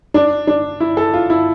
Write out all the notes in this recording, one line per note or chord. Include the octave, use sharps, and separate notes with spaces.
D4
D4
E4
A4
F4
E4